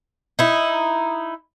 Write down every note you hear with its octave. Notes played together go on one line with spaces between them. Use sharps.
D#4 E4